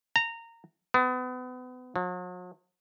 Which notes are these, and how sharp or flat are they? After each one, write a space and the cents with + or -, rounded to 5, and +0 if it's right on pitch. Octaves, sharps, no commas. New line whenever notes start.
A#5 -20
B3 +35
F#3 -45